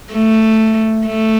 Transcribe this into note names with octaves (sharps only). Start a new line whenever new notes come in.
A3
A3